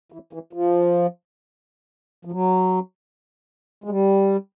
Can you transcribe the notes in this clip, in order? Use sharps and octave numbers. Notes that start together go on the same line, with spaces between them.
E3
E3
F3
F3
F#3
G#3
G3